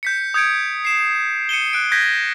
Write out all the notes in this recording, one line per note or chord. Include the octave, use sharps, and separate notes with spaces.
G6 B6 C#7
D#6 G6 G#6 C#7 D7
C7 E7
C#7 D#7 E7 G7
F#6 D7
G6 G#6 A#6 B6